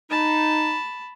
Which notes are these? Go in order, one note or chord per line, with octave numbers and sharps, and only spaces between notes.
D#4 A5 B5